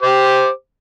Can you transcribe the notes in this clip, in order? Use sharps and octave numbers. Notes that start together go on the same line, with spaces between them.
G4 C5 D6